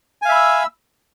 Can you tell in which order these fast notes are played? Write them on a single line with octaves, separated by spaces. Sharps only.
G#5 F5 E5 B5 E6